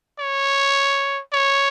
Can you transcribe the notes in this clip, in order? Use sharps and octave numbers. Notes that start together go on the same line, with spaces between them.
C#5
C#5